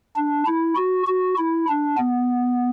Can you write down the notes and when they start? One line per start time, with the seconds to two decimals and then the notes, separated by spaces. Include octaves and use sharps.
0.16 D4
0.46 E4
0.76 F#4
1.07 F#4
1.38 E4
1.68 D4
1.97 B3